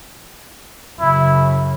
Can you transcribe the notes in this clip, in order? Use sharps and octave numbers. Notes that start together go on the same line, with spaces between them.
F#2 C#3 E4